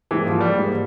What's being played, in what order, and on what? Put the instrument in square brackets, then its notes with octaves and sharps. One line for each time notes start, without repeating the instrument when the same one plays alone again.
[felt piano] G#2 G3 A#3 [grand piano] E3
[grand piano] F3
G3
[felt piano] G#2 G3 A#3